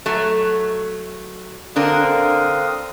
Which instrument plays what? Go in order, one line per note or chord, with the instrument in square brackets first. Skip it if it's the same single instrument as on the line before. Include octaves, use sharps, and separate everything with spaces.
[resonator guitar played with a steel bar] F#3 A3
[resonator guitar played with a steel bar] D3 D4 A#4 [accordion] C4 F5 D#6